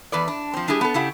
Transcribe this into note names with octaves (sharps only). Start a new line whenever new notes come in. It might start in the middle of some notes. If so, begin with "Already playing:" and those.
E2 B4 D5
D4
F3 C4
G3 D4 E4 G4 G#4
B3 A4
C#3 E4 G4 F#5